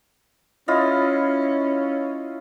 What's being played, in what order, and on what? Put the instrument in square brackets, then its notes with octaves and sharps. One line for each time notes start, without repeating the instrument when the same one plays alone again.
[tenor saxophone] C#4 [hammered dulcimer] E4 F4 D#5